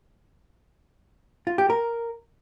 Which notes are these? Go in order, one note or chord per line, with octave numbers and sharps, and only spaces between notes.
F4
G4
A#4